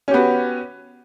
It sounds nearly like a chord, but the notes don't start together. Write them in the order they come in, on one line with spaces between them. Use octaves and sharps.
C#4 G4 B3 F#4